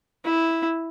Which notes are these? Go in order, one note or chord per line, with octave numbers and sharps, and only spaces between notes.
E4